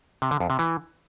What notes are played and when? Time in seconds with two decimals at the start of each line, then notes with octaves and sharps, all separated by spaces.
0.22 C3
0.31 D3
0.40 F2
0.50 C3
0.59 E3